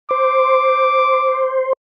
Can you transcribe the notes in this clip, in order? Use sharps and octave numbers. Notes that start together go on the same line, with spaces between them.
C5 D6